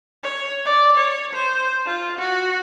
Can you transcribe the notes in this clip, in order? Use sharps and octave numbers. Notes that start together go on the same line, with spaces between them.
C#5
D5
C#5
C5
F4
F#4